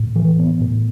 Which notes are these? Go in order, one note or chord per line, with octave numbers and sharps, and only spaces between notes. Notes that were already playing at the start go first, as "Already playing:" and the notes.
Already playing: A2
E3
B3
A2